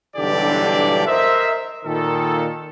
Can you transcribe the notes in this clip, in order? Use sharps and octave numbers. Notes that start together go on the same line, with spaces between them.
B1 G2 D3 E3 G4 D5
A#4 C5 D#5 E5
A#2 D#3 A4